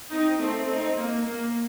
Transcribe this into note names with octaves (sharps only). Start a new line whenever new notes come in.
C4 D#4
A3 C4
C4 D#4
A#3
A#3